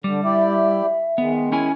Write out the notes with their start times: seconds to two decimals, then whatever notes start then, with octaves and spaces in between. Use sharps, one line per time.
0.04 D3 G3
0.23 E4 G4 D5 E5
1.18 D#3 G#3 B3
1.52 C#4 E4 G#5